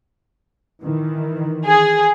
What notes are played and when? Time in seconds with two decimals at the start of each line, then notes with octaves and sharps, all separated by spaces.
0.82 D#3 E3
1.65 G#4